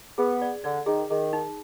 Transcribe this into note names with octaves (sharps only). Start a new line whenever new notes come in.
B3 G#4
D5
D3 D5
D#3 G#4
D#3 G#4
D#4